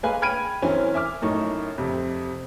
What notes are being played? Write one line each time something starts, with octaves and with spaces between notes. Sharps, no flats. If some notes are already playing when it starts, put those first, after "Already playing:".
G#3 A#3 B4 F5 G#5
G5 B5 F6 G#6 D7 D#7
F#2 E3 C4 C#4 G#5
E5 G#5 D6 F6
F#2 A2 D#4 C#6
F2 C3